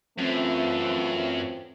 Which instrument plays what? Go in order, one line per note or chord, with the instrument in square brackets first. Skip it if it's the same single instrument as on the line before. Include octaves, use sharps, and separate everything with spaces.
[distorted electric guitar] F#2 [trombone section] E3 A3 F4 [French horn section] C4